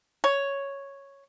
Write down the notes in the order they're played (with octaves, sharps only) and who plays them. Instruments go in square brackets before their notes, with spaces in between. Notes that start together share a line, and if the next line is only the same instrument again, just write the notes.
[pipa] C#5